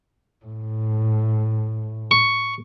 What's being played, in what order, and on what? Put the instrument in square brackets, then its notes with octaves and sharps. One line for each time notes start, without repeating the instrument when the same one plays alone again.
[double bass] A2
[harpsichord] C#6